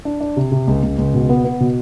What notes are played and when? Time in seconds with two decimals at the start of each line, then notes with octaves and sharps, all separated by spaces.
0.05 D4
0.21 D4
0.37 C3
0.52 C3
0.68 C#2
0.83 C#2
0.98 C#2
1.14 B2
1.29 B3
1.45 B3
1.61 B2